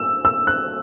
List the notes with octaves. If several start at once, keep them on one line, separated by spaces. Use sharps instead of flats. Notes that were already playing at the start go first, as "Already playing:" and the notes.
Already playing: E6
E6
F#6